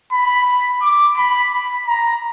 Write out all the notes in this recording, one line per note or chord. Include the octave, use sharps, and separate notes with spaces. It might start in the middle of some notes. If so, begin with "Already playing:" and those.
B5
D6
B5
B5
A#5